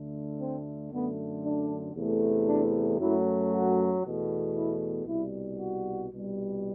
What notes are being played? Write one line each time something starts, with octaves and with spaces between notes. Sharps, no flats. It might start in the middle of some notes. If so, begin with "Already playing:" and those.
Already playing: D2 D3 A3
C4
F#2 D3 A3 B3
D4
E2 C3 E3 A3
D4
F#2 F#3 A3 E4
F#4
E2 B2 A3
E4
C2 B2 G3 E4
F#4
C2 B2 G3